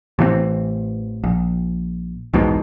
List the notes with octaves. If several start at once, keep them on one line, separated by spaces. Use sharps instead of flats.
A1 E3 A3 C4
A#1
B1 E2 G#2 B2